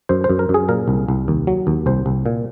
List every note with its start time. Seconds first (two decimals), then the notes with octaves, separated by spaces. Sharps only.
0.09 F#2 C5
0.24 C5
0.29 F#2
0.39 A#4
0.49 F#2
0.54 G#4
0.69 A#2 A#4
0.88 C2
1.08 C2
1.28 D#2
1.47 F#3
1.67 D#2
1.86 C2 C5
2.06 C2
2.26 A#2